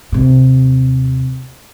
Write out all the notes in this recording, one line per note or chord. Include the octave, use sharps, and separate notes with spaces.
D#2 C3